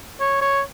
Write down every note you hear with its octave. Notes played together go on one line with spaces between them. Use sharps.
C#5
C#5